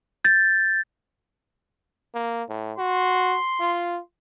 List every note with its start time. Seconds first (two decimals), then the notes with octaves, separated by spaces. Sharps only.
0.25 G6 A6
2.14 A#3
2.49 A2
2.78 F#4 C6
3.60 F4